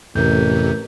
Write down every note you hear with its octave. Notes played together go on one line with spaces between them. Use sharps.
A1 F2 C3 A#4 G6